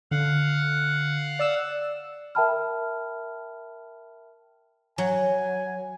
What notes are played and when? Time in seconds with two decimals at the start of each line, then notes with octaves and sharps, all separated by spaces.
0.11 D3 F5 F#5
1.39 D5 E6 E7
2.35 A#4 E5 G5 A5 B5 F6
4.98 F#3 G#5